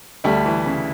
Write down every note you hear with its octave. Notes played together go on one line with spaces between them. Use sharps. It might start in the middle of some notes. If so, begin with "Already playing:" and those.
D2 G3 A3
E3
C#3